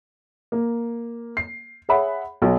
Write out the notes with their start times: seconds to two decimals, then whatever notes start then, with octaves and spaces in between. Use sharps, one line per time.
0.52 A#3
1.37 C7
1.89 G#4 C#5 E5 F#5 B5
2.42 B1